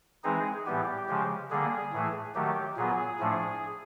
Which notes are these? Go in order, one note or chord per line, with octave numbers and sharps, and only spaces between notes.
E3 G#3 C4 D#4 G#4
A2 E3 G3 B3 G4
C#3 F3 G#3
D3 G3 A#3 G#4
A2 E3 A3
D#3 F#3 A3 G4
A#2 F#3 B3 G#4
A2 F3 A3 D4